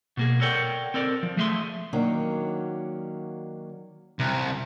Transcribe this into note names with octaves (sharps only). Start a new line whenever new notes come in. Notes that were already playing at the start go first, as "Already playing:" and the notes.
B2 A#3 G#4
A4 A#4 C#5 D5 F#5 G5
C4 A4 A#4 D5
F3
F3 A3 G#4 E5 A#5 C6
D#3 F#3 A#3 C#4 D4
C2